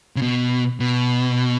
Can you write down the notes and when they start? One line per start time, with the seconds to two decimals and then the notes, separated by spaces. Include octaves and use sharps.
0.16 C#3
0.22 B2
0.80 B2